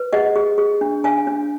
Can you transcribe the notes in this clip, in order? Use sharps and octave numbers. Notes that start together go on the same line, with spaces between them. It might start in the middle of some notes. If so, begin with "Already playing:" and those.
Already playing: B4
G#4 D#5 F#5
G#4
G#4
D4
D4 F5 G#5
D4